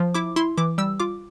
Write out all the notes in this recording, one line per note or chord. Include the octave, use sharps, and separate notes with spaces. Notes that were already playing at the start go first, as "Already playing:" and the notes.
Already playing: F3
E4 D6
E4 C6
E3 D6
G3 E6
F4 D6